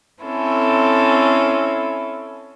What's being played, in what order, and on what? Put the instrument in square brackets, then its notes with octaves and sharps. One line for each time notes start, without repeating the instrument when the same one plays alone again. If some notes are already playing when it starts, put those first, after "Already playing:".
[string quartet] C4 C#4 E4 A4